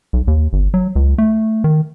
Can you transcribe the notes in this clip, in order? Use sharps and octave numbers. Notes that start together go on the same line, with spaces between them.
B1
D#2
G1
F#3
C#2
A3
D#3